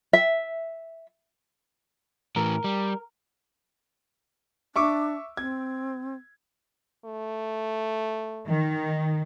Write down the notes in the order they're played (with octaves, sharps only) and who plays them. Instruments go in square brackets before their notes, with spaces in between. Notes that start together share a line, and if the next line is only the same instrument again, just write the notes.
[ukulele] E5
[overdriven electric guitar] A2 E3 [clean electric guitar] A#4
[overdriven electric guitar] G3
[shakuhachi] D4 [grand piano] E5 C#6 D6
[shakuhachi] C4 [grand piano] G#6
[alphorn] A3
[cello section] D#3